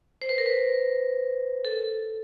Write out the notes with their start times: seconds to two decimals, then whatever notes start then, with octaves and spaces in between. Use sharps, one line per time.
0.21 C5
0.29 B4
0.38 A#4
0.46 B4
1.65 A4